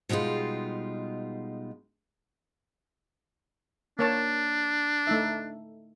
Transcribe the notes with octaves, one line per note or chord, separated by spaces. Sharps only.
B2 G3 G#3 D#4 F4
A#3 D4 C#5 A5
A3 D#4 E5